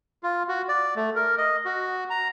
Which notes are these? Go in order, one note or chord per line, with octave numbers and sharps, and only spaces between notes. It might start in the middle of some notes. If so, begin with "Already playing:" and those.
F4
F#4
D5
A3
A#4
D#5
F#4
A#5